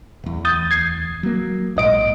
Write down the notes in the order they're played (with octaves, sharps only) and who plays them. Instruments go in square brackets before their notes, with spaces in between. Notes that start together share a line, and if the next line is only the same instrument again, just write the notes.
[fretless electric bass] D1 E2
[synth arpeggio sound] D#6 G6 A6
G#6 C7
[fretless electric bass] F#3 A#3
[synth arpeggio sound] A#1 D#5 D7 [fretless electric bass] G#2